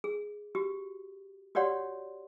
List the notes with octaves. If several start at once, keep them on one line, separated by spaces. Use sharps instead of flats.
G#4
F#4 G4
F#4 G4 C#5 D5 F#5 C6